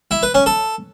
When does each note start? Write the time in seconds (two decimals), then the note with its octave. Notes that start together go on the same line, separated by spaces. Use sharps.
0.11 E4
0.23 B4
0.34 C#4
0.46 A4